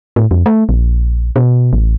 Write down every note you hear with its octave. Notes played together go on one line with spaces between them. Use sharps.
A2
F2
A3
A#1
B2
A1